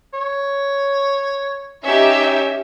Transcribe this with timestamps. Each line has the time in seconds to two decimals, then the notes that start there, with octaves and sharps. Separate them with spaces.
0.13 C#5
1.85 C#4 D#4 G4 E5